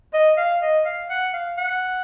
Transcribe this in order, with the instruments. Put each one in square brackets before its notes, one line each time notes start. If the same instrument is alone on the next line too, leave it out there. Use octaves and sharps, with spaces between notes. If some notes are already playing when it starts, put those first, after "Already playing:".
[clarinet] D#5
F5
D#5
F5
F#5
F5
F#5